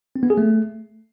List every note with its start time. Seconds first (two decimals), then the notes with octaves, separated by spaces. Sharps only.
0.16 C4
0.23 B3
0.30 G#4
0.37 A3